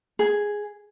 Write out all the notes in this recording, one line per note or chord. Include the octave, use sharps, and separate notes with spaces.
G#4